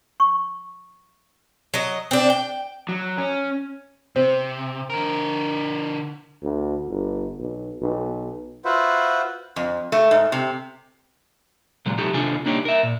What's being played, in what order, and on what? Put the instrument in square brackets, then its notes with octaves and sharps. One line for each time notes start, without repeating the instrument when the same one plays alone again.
[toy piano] C#6
[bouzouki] F#3 D#5
C4 D4
G5
[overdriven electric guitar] F#3
C#4
[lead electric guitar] C3 [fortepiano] C4
[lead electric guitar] D3 A#4
[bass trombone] D2
G1
B1
B1
[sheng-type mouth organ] F4 F#4 B4 C5 E5 F#5
[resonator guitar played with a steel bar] F2
A3
G#2
C3
[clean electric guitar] A#2 C#3 F#3 G#3
C3 F#3 D#4 G4 A4
D#2 C3 D4 F4 A4 G#5
C2 A#3 D4 D#4 G4 C#5
A#4 E5
A#2